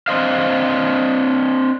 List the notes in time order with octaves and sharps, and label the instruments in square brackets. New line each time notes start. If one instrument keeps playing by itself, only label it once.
[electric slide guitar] C4 D4 C5 D#5 F5